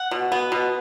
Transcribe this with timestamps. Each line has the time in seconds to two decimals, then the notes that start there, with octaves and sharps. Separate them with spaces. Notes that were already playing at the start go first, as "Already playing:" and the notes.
Already playing: F#5
0.11 B2
0.32 B3
0.52 B2